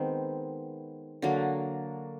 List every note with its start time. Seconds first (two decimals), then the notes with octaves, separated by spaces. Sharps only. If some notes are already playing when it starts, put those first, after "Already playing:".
Already playing: D#3 G#3 B3 C4
1.22 D3 F#3 A#3